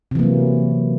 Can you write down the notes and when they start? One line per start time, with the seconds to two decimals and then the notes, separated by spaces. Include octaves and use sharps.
0.11 C3
0.15 E3
0.19 A#3
0.23 F#3